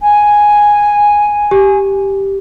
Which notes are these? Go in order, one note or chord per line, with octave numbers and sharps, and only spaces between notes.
G#5
G4